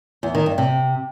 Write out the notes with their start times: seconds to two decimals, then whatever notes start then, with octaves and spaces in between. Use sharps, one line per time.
0.23 E2
0.35 D#3
0.46 G2
0.58 C3